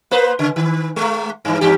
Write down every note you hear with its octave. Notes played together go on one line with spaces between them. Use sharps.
A#3 B4 C5
C#3
D#3
G#3 A3
G2 E3
E2 G2 G4